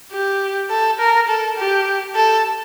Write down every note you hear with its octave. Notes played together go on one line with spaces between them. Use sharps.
G4
A4
A#4
A4
G4
A4